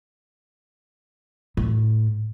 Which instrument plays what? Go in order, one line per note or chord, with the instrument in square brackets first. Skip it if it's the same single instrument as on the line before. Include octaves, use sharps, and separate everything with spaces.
[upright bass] A2